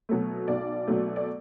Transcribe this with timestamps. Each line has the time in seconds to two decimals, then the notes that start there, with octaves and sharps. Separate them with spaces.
0.09 B2 F#3 A3
0.48 B1 D5
0.87 B2 F#3 A3
1.16 D5